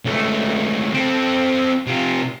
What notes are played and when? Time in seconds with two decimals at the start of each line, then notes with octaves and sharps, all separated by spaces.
0.05 C#2 A3
0.94 C4 A4
1.87 C3 F4